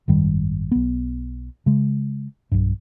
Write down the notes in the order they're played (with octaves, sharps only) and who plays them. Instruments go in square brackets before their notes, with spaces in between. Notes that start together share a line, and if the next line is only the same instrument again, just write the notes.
[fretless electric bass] G#1 F#2 D#3 G3
B1 B3
C#3 G#3
B1 G2